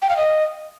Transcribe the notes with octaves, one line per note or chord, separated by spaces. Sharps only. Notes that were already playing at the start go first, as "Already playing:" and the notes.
G5
F5
D#5